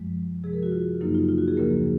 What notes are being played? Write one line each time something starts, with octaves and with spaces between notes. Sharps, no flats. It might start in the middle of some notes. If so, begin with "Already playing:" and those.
Already playing: F#2 F3 G#3
C3 F3 G#3 G#4
A#4
F#4
F4
F#2 C#3 F#3 A#3 D#4
F4
F4
F#4
G#4
D#2 C#3 F3 A#3 A#4